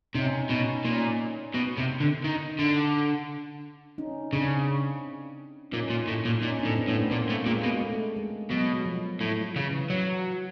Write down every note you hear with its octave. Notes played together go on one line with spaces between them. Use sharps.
C3 C#4 D#4
B2 C#4 D#4
A#2 C#4 D#4
B2
C3
D3
D#3
D3
C#4 D#4
C#3 C4 D4
A#2 C#4 D#4
A#2
A2
A#2
A#2 C#4 D#4
C4 D4
A2
B3 C#4
A2
C4 D4
A#2 A#3 C4
A2
A#2 G#3 A#3
B2
A3
G#3
B2 F#3
F3
A2
C#3 E3
F#3